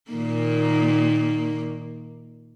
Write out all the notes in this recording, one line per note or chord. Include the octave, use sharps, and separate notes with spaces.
A#2 D#3 A#3